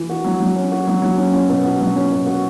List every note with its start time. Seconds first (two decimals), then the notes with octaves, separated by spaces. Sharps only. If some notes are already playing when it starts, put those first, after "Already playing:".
Already playing: E3
0.09 F#4
0.24 F#3
0.40 F#3
0.56 C#4
0.72 F#4
0.87 F#3
1.02 F#3
1.18 C#4
1.33 C#4
1.49 B2
1.64 F#4
1.80 F#3
1.96 C#4
2.11 B2
2.26 F#4